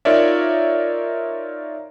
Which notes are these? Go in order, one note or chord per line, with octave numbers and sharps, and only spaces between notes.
D#4 F4 A#4 C#5 D5 E5